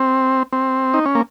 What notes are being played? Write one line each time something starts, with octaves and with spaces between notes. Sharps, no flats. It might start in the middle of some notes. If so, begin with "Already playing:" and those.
Already playing: C4
C4
D#4
C#4
A#3